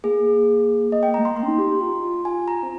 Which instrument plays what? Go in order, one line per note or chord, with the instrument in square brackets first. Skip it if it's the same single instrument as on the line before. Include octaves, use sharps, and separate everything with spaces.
[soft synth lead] A#3 [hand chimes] G#4
[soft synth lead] A#3 [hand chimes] D#5
[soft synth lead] A#3 [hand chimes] G5
[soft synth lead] G#3 [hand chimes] A#5
[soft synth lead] A#3 [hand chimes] C6
[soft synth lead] A#3 [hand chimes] C6
[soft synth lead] C#4
D#4
G4
G4
F4
F4
[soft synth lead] F4 [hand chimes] G#5
[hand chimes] A#5
[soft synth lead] C4